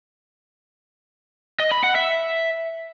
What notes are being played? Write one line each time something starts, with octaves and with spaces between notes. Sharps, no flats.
D#5
B5
F#5
E5